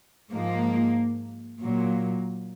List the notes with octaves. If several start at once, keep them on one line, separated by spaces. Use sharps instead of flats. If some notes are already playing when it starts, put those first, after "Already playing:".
G#2 F3 G#3 A#3
A#2 F#3 A#3